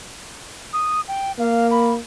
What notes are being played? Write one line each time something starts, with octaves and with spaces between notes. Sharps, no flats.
D#6
G5
A#3 F5
B5